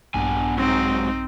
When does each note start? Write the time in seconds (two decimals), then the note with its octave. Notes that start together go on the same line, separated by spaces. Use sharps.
0.14 A#1 G2 B3 D4 G#5
0.57 G#2 F#3 C4 D#4